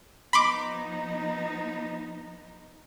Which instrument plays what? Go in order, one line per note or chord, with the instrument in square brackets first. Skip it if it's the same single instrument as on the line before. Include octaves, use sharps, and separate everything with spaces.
[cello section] F3 B3 D#4 [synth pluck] B5 C6 D6